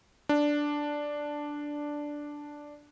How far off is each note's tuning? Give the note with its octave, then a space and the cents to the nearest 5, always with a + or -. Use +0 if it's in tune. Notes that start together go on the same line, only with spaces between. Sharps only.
D4 +0